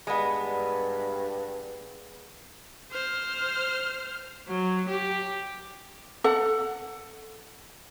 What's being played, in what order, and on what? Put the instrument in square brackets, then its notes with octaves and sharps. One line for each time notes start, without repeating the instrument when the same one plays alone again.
[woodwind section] G2 [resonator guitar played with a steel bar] G#3 B3
[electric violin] C5 F6
[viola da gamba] F#3
G4
[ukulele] A4 F#5